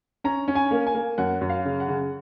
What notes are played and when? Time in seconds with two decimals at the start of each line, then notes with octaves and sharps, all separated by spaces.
0.24 C#4 A#5
0.48 C#4
0.55 G#5
0.71 A#3
0.87 G#5
0.95 A#3
1.18 F#2 F#5
1.41 F#2
1.49 F5
1.65 C#3
1.80 F#5
1.88 C#3